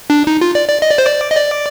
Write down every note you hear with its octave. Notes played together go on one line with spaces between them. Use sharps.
D4
D#4
F4
D5
D5
D#5
D5
C5
D5
D#5
D5